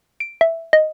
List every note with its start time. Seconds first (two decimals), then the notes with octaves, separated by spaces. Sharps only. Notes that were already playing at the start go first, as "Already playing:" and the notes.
0.20 D7
0.41 E5
0.73 D#5